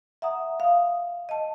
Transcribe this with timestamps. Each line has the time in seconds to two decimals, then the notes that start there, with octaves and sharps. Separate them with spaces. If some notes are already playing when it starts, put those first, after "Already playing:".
0.22 E5 F#5 A#5 D#6
0.60 F5 D#6
1.29 D#5 A5